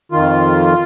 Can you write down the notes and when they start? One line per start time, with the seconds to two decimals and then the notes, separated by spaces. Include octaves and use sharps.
0.12 F2 D#3 F4